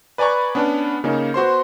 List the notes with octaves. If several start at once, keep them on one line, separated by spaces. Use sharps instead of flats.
B4 D5 G#5 A#5 B5 C#6
B3 C#4 D4
C#3 A#3 C#4 D#4
B3 F#4 C5 C6